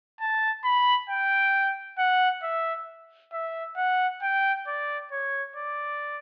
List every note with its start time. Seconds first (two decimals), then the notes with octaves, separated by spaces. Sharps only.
0.20 A5
0.64 B5
1.10 G5
1.98 F#5
2.43 E5
3.33 E5
3.77 F#5
4.22 G5
4.67 D5
5.12 C#5
5.56 D5